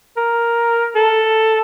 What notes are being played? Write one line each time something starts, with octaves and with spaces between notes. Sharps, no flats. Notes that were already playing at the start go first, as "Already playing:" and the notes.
A#4
A4